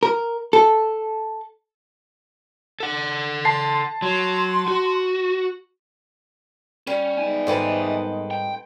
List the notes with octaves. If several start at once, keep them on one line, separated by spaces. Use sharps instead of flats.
A#4
A4
A4 F#5
A5 C6 C7
F#3 C6
F#4
G3 C#4
G#3 B3 D#4 E5 G#5
G#2 D#3 G3 C4 A4 B4
G5